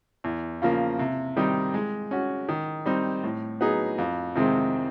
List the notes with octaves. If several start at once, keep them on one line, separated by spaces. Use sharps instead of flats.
E2
C#3 F3 A#3
C3
D#3 G3 C4 D#4
G#3
C#4 F#4
D#3
G3 C4 D#4
A2
F#3 B3 D#4 G#4
F2
C3 D#3 G#3 C4